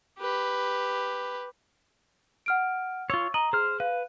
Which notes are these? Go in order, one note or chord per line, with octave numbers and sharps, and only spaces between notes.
G4 B4
F#5 F6 D7
F4 C#5 C#6 E6
D#5 A#5 F#7
G#4 C5 F6
B4 F5